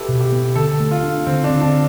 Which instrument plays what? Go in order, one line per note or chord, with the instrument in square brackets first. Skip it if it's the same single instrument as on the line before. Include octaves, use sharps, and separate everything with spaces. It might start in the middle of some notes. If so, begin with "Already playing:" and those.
Already playing: [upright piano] E4 G4 A4 B4
[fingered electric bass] B2
[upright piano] G4
[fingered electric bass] B3
[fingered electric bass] D3 [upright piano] A4
[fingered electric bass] A3
[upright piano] F4
[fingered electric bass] D4
[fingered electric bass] D3 [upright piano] C4
[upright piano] D4
[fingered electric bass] D3
[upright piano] D4